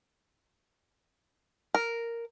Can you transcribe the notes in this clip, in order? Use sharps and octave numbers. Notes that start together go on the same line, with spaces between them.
A#4